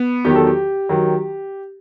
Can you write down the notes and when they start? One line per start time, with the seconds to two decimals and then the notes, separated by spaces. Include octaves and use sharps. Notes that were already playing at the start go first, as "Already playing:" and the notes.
Already playing: B3
0.25 E2 D#3 F#3 G4
0.35 A4
0.47 G4
0.89 D#3 F#3